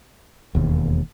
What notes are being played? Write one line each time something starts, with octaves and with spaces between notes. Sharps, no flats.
E1 D#2